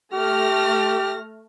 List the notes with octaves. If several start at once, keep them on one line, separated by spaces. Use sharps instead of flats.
A3 G4 F6 A#6